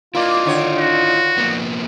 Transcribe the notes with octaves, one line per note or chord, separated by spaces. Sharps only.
A#3 E4 F4 D5 D#5
D3 D#3 C#5
F#4
F3 A#3 B3